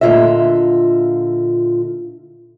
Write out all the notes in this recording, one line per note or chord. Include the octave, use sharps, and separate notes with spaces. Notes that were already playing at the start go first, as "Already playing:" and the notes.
A#2 D3 F3 F4 D#5 E5